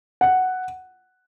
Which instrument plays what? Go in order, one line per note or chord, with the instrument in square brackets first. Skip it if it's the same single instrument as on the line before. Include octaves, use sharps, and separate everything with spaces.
[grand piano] F#5